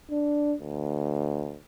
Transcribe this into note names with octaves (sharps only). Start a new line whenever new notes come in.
D4
D2